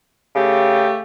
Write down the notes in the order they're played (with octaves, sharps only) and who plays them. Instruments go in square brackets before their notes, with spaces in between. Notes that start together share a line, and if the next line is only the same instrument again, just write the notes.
[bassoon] C#3 [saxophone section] A3 G4